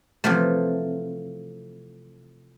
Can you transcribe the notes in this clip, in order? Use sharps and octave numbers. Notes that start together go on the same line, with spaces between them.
C3 E3 F3 A3